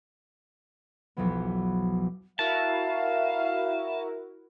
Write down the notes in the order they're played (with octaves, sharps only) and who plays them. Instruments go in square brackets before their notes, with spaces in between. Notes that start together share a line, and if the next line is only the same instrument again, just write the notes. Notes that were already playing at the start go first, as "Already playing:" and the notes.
[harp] B1 E2 F3 F#3 B3
[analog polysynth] E4 F#4 A#4 [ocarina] E5 [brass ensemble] F5 [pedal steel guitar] A5